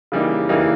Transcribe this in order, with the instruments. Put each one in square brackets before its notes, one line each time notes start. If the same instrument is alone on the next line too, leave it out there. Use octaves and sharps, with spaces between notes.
[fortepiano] C#3 E3 G3 A#3 D#4
C#3 E3 G3 A#3 D#4